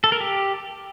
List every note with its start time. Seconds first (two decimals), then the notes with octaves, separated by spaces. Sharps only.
0.04 A4
0.12 A#4
0.20 G4